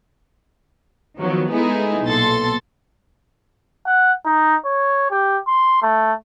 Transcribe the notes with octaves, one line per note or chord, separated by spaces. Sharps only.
D#3 F3 F#3 B3
G#3 A3 B3 D#4 E4 G#4
B1 A#2 A4 C6 A6
F#5
D#4
C#5
G4
C6
A3